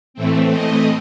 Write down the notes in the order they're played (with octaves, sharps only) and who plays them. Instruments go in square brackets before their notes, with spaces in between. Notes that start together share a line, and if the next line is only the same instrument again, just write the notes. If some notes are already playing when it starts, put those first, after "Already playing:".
[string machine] A2 E3 A3 C4
D#5